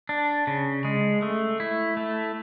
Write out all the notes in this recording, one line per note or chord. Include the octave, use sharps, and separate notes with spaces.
D4
C#3
G#3
A3
E4
A3